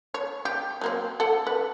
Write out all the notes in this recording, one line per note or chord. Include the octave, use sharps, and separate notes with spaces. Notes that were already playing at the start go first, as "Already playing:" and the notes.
C#5
G4
F#3 A#3 C4
A4 F#5
B4